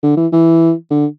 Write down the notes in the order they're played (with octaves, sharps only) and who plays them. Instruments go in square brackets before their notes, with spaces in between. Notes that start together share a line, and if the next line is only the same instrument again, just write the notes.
[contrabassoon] D3
E3
E3
D3